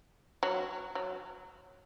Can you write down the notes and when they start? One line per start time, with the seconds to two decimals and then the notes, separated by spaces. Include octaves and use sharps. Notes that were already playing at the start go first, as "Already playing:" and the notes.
0.43 F#3
0.95 F#3